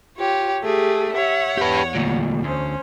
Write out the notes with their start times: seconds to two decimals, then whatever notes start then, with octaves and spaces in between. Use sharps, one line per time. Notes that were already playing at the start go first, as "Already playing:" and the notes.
0.17 F4 G4 C#5
0.64 A3 G4 G#4
1.13 C#5 E5 F#5
1.57 E2 G4 B4
1.95 D2 A#2
2.44 D2 C#4 C5